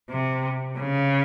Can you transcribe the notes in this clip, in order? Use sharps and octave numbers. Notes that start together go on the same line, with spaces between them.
C3
C#3